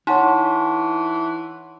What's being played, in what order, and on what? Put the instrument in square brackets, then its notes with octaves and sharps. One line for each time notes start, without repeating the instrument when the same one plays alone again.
[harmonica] E3 [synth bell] D#4 [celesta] C#5 F#5 C6 [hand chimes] A5 C#6